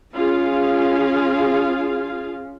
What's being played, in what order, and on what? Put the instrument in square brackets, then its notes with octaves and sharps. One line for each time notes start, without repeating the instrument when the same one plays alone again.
[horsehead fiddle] C#4 [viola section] F4 G#4 F5